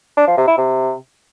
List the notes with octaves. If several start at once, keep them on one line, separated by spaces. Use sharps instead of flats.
D4
F3
C3
E4
C3